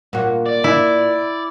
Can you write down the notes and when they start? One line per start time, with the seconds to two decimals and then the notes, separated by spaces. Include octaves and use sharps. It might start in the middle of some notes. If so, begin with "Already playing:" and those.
0.13 A#2 F#4
0.46 D5
0.64 E4